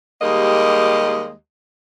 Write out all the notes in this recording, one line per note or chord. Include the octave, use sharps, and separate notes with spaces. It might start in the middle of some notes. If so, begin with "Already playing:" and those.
D#2 G3 G#3 A#3 G4 D#5